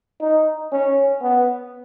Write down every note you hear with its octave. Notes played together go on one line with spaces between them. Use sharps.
D#4
C#4
B3